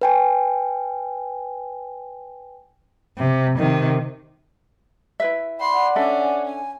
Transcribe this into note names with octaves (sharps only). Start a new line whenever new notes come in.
B4 G5 G#5
C3
C3 D#3
E4 B4 E5
D5 F#5 B5 C6
C#4 D4 A4 E5 G#5
G#5